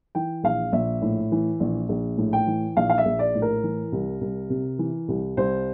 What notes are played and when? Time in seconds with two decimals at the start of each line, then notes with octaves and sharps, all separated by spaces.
0.15 E3 G5
0.43 A#1 F5
0.72 A#1 E5
1.02 A2
1.32 E3
1.60 A#1
1.89 A#1
2.18 A2
2.33 G5
2.47 E3
2.76 A#1 F5
2.90 F5
2.98 E5
3.05 A#1
3.19 D5
3.35 A2
3.42 A#4
3.63 E3
3.92 C2
4.21 C2
4.50 C3
4.79 E3
5.08 C2
5.37 C2 C5